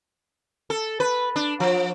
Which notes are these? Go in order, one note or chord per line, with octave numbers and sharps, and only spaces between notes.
A4
B4
D4
F3